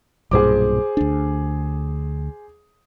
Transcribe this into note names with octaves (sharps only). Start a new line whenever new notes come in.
B1 G2 A#2 G#4 C5 D6
D2 D4